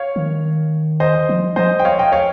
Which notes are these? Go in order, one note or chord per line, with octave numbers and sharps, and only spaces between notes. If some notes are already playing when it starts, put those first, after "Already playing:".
Already playing: C#5 F5
D#3
C5 D#5
F3
F3 C5 D#5
G5
C#5 F5
D#5 G5
C#5 F5